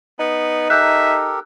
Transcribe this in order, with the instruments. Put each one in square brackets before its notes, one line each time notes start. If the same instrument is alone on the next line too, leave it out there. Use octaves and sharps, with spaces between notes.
[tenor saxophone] B3 [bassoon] D#4
[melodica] G4 A4 A#4 [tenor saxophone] E5 [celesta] F#6 G6